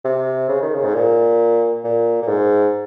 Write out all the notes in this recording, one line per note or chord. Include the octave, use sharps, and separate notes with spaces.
C3
C#3
D#3
C#3
G#2
A#2
A#2
A#2
G#2